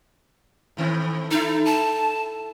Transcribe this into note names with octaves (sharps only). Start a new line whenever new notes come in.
A2 D#3 C4
D#4 E4 A4
A5